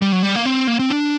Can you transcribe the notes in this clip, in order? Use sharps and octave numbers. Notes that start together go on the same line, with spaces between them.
G3
F#3
G3
A#3
C4
A#3
C4
D4